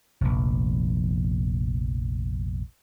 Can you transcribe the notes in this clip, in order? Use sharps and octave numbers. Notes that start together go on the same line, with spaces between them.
F1 A#1